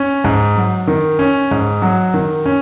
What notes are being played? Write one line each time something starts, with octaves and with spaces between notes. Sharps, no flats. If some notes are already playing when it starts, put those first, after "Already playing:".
Already playing: C#4
G#2
F#3
D#3
C#4
G#2
F#3
D#3
C#4